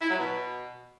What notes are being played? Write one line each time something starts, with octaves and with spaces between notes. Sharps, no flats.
E4
F#3
B2